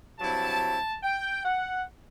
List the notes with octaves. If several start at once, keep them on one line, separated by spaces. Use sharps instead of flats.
G2 F#3 C4 E4 A5
G5
F#5